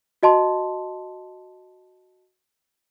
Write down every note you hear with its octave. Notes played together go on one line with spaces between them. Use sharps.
F#4 D#5 A5 C6